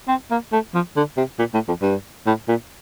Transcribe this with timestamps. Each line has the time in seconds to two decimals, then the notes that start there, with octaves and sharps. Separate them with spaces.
0.08 C4
0.31 A#3
0.52 A3
0.74 F3
0.96 D3
1.17 C3
1.39 A#2
1.54 A2
1.68 F2
1.82 G2
2.26 A2
2.48 A#2